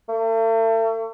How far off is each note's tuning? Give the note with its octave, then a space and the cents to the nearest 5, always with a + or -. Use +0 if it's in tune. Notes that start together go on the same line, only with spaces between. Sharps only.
A3 +40